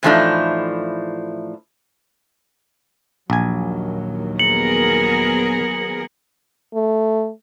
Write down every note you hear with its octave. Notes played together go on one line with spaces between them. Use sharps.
A2 E3 F3 A3 D4 D#4
A#1 D#2 D#3 F#3 G#5
B3 G#4 A#4 C#7 F#7
A3